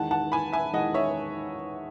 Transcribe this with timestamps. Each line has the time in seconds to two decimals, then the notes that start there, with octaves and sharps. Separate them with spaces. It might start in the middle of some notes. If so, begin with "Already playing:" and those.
Already playing: E2 D#3 G#3 F#5 A5
0.11 F#5 A5
0.32 G#5 B5
0.53 E5 G#5
0.73 E2 D#3 G#3 D#5 F#5
0.94 C#5 E5